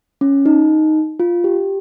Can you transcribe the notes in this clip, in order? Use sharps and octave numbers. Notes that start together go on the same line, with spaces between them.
C#4
D#4
F4
G4